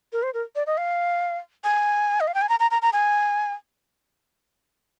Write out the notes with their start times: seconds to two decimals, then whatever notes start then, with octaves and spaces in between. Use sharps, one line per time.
0.13 A#4
0.23 C5
0.34 A#4
0.56 D5
0.67 D#5
0.78 F5
1.64 G#5
2.20 D#5
2.27 F5
2.34 G5
2.42 G#5
2.49 A#5
2.60 A#5
2.71 A#5
2.82 A#5
2.93 G#5